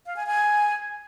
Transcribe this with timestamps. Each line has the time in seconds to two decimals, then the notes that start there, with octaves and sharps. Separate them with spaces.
0.06 F5
0.16 G#5
0.26 G#5